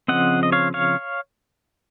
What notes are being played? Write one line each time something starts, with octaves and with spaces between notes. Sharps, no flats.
C#3 F3 C4 D#5 F#5
D#5
C#5 F5
C#5 F5